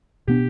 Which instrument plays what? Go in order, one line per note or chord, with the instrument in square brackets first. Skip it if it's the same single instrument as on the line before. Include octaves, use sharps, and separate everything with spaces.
[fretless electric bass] B2 B3 D4 [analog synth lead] G4